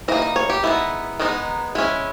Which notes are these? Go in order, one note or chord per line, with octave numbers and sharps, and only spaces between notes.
E3 A#3 D#4 D#5
D#5
C#5
G4
G#3 B3 D#4 E4
D#3 G#3 B3 D#4
G#3 C#4 E4